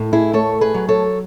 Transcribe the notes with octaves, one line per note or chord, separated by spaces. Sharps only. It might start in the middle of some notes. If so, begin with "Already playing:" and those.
Already playing: A2 A3
E4 G#4
A3 A4 C#5
G#4 B4
F#3
A4 C#5